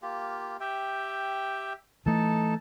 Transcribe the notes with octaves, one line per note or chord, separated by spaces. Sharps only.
A#3 F4 G4
G4 E5 G5
E3 A3 D#4 A4 A5